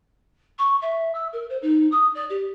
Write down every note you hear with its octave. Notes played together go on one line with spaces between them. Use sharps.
C#6
E5
E6
A#4
C5
D#4
D#6
D5
G4